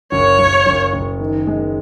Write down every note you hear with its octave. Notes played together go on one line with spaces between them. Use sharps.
F#1 C#5
F#1
F#1
F#1
D#3
G#3